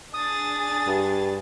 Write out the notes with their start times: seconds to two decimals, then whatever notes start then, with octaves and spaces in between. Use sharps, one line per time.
0.14 D4 G#4 D#6 A6
0.87 G2